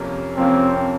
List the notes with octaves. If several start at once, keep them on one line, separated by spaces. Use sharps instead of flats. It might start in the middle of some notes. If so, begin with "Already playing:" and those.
Already playing: F2 C3 F3 A#3 C#4
F2 C3 F3 A#3 C4 C#4